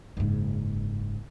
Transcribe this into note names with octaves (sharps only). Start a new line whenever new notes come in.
F#1 G#2